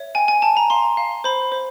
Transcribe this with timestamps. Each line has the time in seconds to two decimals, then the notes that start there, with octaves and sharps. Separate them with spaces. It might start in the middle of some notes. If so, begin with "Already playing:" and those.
Already playing: C#5 E5
0.15 G5 G#5
0.28 G#5
0.42 G5 A5
0.57 A#5
0.70 F5 C6
0.97 F5
1.24 C5 B5
1.52 C5